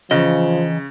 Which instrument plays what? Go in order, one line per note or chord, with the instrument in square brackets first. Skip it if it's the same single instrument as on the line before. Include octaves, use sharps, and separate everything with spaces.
[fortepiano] C#3 [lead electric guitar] E3 D#5 [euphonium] F3